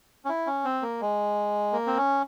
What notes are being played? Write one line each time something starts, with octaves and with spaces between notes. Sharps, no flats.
C#4
E4
C#4
C4
A#3
G#3
A#3
C4
C#4